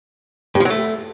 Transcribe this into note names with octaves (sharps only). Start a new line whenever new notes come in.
G2
F3
F#3
A3